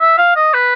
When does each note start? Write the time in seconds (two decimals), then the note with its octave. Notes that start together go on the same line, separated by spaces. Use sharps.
0.01 E5
0.18 F5
0.36 D#5
0.54 B4